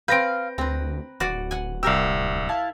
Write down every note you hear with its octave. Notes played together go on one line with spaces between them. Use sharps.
C4 B4 F5 G6 A#6 D7
D2 C4 B4 A#5
D1 F#4 D5 F#5
F#5 G#5
C2 G4 A#4 F5 E6
E4 F5 A5